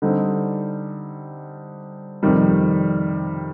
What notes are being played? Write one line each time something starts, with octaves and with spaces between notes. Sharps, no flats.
D3 G3 C4 D#4
F2 C3 D#3 G3